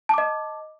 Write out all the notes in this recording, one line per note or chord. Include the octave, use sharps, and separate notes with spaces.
D#5 A5 D6